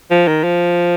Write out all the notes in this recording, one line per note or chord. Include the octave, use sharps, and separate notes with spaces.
F3
D#3
F3